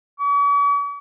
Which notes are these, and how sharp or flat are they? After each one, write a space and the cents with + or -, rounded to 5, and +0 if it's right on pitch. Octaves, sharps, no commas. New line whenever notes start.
C#6 +45